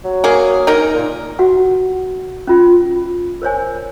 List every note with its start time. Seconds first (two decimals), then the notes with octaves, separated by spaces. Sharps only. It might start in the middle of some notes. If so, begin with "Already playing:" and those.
0.04 F#3
0.24 A#3 G#4
0.67 D#4 A#4
0.94 A#2
1.39 F#4 F#5
2.47 C#4 F4
3.42 A#4 C5 C#5 G#5